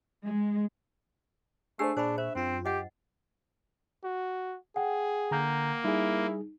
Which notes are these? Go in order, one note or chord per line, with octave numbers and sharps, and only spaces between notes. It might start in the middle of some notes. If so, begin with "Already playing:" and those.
G#3
A3 D4 G#4 C5 D5 E6 C7
A#2 D4 G#4 C5 B5 C#6
C5 E5
F#2 C4 F4
G4 D#5 F#5
F#4
G#4 F#5 G5
D3 A#3 A#5 G6
G3 D#4 E4 G#4